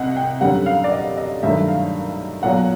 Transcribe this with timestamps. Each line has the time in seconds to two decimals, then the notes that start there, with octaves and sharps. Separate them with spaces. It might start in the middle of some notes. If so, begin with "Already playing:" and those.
Already playing: C2 D#5 F#5
0.16 G5
0.41 F#2 D3 G3 F#5
0.66 F5
0.84 D5
0.92 D#5
1.17 D#5
1.43 G2 D#3 F#3 A3 C#4 E5
1.68 F5
2.43 B1 A#2 F#3 F#5